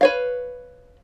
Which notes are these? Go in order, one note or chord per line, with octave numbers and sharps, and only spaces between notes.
B4 C#5 F5